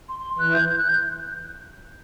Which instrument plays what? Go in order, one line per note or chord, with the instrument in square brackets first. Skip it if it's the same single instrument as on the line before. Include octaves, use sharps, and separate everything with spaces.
[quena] C6
C6
[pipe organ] E3 [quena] F#6
[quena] G6
G6
F#6
G6